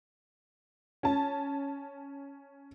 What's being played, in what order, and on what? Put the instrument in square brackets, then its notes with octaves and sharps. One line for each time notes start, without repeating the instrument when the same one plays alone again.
[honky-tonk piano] C#4 A5